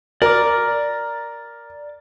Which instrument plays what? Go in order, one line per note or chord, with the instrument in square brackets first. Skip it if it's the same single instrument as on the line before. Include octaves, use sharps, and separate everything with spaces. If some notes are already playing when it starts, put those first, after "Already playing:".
[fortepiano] A#4 [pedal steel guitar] D5 D6